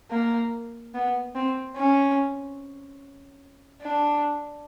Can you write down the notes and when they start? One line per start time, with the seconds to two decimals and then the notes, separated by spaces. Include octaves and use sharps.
0.11 A#3
0.94 B3
1.35 C4
1.76 C#4
3.82 D4